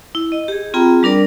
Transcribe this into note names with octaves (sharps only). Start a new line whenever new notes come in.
E4
D#5
G4 G#4
C4 F4 G#4 G5 A#5 B5
G3 D4 A#4 D5